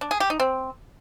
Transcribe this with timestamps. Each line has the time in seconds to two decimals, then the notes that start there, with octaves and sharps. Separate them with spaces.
0.01 D4
0.11 G#4
0.20 G4
0.30 D#4
0.40 C4